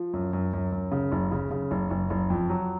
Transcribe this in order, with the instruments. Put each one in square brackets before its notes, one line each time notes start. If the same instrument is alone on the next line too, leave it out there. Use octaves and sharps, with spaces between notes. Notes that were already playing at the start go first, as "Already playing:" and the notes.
Already playing: [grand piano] F3
F#2
F#2
F#2
F#2
C#3
F#1
C#3
C#3
F#1
F#1
F#1
F2
F#3